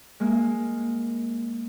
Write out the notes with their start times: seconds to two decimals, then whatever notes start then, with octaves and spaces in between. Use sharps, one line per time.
0.20 G#3 A#3